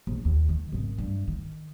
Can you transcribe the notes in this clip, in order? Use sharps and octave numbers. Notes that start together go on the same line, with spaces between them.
A#1
D#2
D#3
G#1 C#3
G2
D#3